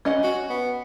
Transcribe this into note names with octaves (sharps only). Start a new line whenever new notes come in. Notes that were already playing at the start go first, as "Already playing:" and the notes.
C#4 D#5 F#5
F#4
B3